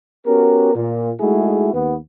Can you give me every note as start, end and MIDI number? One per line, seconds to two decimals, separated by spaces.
0.27 0.72 59
0.27 0.72 61
0.27 0.72 66
0.27 0.72 67
0.27 0.72 70
0.75 1.11 46
1.20 1.72 56
1.20 1.72 57
1.20 1.72 63
1.20 1.72 64
1.20 1.72 66
1.20 1.72 68
1.74 1.95 39
1.74 1.95 59